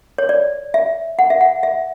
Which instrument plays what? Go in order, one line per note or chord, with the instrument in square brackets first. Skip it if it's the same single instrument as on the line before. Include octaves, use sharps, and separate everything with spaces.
[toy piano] C#5
D5
E5
F#5
E5
F#5
E5